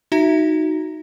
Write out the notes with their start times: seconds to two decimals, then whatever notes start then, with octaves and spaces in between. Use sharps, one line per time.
0.12 D#4 F#4 E5 A#5 A#6